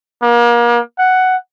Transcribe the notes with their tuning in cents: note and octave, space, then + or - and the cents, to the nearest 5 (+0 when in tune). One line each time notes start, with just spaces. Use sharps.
A#3 +35
F#5 +5